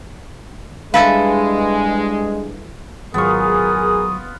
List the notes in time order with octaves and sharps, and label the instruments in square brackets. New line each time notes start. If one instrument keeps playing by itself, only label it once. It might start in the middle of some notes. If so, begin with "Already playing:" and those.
[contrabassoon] G2 [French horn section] G#3 [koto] E4 A4 B4 [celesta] F5
[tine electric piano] G#1 F#3 C#6 [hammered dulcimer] B3 F4 [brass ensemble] G#4 A#4 [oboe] D#6